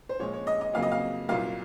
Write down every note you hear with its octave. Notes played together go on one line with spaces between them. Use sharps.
C5
A#2 F3 G#3 C#5
C#5
D#5
D#5
F2 C#3 F#3 A#3 F5
D#5
F5
C2 A#2 F#3 A#3 F5